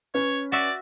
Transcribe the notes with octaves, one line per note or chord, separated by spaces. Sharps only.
C#4 B4 C#5
F#4 D5 E5